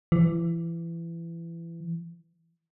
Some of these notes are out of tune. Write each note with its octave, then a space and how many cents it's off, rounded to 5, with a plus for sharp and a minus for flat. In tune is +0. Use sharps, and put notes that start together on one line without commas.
E3 +25